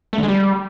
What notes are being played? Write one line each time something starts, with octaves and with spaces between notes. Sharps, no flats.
A3
D3
G#3
G3